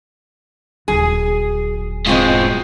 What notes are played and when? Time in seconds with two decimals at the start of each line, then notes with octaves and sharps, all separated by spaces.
0.88 D#1 F#3 G#4
2.07 G#2 B2 G#3 C4 F4